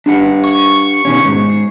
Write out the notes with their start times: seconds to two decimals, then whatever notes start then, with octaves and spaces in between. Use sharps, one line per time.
0.06 D4 G4 F#5
0.44 C#6
1.05 B2 D#3 C#4
1.25 G#2
1.49 C7